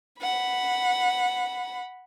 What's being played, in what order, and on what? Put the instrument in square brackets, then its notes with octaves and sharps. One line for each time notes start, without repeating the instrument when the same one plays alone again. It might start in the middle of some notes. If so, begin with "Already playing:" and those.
[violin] F#5 B5